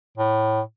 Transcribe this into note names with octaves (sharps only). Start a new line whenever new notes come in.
A2